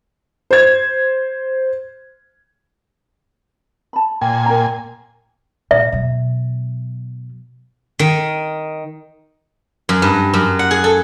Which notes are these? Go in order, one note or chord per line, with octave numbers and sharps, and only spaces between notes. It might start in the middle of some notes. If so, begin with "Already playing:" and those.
C5 G#6
A5 B5
A#2 G5 G#5
A#4 G5 A#5
A#2 E5
B2 F#3
D#3
F#2
G2
F#2
F#5
G#4
A4